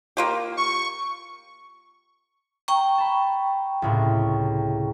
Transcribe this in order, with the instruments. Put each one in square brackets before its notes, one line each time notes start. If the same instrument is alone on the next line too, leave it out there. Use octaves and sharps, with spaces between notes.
[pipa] A#3 F4 G4
[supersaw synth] C#6
[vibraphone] G5 A#5 C#6
[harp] A5 B5
C#2 A2 C3